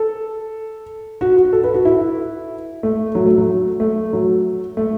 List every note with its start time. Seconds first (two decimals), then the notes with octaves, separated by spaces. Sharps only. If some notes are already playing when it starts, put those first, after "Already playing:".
Already playing: A4
1.21 F#4
1.37 F#4
1.53 A4
1.64 B4
1.74 F#4
1.85 E4
2.83 A3
3.15 F#3
3.26 A3
3.38 F#3
3.80 A3
4.13 F#3
4.77 A3